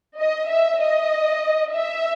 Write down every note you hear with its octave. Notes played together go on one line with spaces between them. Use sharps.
D#5
E5
D#5
E5